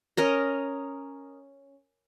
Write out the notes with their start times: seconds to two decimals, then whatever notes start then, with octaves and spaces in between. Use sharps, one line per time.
0.17 C#4 A#4 D#5